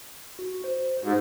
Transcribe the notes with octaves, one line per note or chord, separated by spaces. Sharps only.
F#4
C5
G#2 F#4 G4